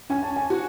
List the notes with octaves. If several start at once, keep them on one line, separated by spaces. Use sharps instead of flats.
C#4 G#5
A5
G#5
F#4